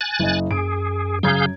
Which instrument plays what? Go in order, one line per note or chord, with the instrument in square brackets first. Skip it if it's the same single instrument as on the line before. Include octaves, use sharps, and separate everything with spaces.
[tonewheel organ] G#5 F#6 A6
[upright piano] F#1 D#5
[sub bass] F#2 [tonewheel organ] G#4 [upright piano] D7
[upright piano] F#2 A#5 G#6 [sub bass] C#3 [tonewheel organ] G#4 F5 G6